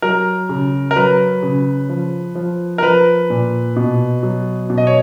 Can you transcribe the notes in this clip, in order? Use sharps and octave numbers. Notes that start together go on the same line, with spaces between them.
F#3 A#4
C#3
A#4
F#3 B4
C#3
F3
F3
A#4
F3 B4
A#2
B2
F#3
B2
D#5
C#5